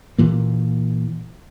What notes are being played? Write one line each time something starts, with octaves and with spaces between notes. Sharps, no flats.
A#2 E3 A#3